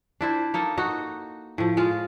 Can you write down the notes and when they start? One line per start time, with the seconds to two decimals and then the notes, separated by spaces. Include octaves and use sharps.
0.21 D4 E4 C5
0.54 A#3 D#4 A4
0.78 D#4 F#4
1.58 A2 F3
1.77 G#3 F4